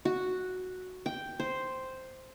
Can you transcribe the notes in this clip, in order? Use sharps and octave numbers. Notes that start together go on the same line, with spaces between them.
F#4
G5
C5